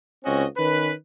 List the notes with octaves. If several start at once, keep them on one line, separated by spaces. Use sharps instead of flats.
C#2 C4 C#4 F#4 D#5
D#3 C#4 B4